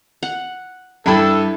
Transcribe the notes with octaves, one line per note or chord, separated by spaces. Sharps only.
F#5
G2 D4 E4 A4 G5 B5